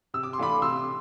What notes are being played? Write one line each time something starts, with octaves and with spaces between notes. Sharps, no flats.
C3 E6
D6
C6
E3 A3 D4 F4 B5 D6
C3 C6 E6